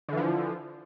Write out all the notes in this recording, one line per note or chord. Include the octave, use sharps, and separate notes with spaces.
D3 E3 F3